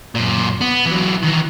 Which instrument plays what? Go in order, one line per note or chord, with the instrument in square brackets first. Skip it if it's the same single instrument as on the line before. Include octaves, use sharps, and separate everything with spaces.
[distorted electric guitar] F#2 A#2
B3
E3 F#3
D#3 E3